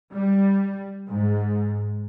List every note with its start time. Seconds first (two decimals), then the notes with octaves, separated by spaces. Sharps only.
0.14 G3
1.08 G#2